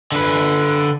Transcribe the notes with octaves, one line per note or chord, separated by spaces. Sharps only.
D3 B4